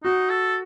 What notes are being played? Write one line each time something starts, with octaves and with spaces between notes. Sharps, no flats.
D#4 F#4
A4